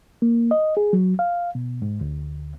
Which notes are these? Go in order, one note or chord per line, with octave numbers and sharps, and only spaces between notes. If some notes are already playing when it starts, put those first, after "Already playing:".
A#3
D#5
G#4
F#3
F5
B2
G#2
D2